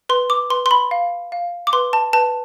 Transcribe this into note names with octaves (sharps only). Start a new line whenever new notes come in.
B4 C6
D6
B4 C6
C6
B5
F5
F5
D6
B4 C6
A5
B4 A5